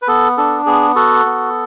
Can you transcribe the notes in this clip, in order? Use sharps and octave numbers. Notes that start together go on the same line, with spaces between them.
B4
B3 A4
D4 A4
B3 G#4
F#4 A4
B3